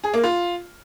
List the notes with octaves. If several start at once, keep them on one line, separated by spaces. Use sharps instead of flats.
G#4
A#3
F4